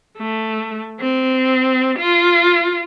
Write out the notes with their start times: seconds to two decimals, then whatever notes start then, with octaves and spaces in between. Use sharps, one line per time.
0.18 A3
1.00 C4
1.99 F4